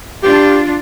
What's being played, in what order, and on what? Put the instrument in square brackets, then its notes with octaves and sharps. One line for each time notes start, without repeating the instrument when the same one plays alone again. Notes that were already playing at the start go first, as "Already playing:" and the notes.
[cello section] D4 F4 [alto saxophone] G4